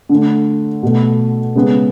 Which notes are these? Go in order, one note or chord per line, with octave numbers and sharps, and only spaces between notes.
D3 A3
B2 A3
C#3 G#3 B3